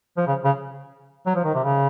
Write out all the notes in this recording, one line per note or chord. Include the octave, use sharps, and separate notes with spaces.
F3
C#3
C#3
F#3
F3
D#3
C3
C#3